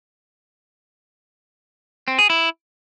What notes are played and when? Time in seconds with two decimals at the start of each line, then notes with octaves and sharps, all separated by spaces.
2.08 C4
2.19 G#4
2.30 E4